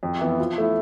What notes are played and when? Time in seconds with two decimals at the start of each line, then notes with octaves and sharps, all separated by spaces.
0.03 F2
0.21 E3 B3
0.40 F3
0.58 A3 E4